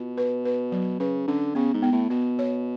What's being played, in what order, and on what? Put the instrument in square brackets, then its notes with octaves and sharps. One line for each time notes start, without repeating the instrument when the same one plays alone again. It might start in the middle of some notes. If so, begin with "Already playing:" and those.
Already playing: [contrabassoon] B2 [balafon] F4
[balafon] B4
B4
F#3
[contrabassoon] C#3 [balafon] B4
[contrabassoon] D3 [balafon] C#4
[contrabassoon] C#3 [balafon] B3
[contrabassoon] G#2
[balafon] B3
[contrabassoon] A2
[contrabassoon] B2 [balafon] B3
[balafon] C#5